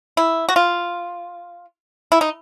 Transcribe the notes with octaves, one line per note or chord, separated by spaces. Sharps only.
E4
F#4
F4
E4
D#4